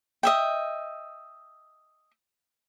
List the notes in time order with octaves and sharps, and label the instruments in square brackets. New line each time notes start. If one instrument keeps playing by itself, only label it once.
[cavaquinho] D#5 E5 G5